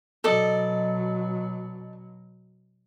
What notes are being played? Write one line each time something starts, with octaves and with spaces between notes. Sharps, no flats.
B2 F#3 A4 D5 D#5